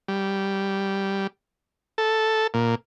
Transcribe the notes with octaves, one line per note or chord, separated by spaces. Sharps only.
G3
A4
A#2